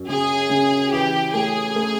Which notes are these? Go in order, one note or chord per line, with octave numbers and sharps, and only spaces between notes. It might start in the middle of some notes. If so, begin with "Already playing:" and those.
Already playing: F#2
C#3 G#4
C#3
E3 G4
A3 G#4
A3